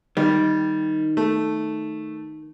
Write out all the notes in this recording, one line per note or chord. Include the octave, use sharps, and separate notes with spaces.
D#3 G3
A3